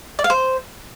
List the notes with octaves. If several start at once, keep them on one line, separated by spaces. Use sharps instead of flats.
D5
F5
C5